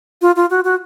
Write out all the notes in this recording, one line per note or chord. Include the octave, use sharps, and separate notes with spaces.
F4
F4
F#4
F#4